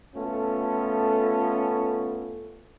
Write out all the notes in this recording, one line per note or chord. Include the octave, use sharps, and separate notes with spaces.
A3 B3 C#4 F4 A4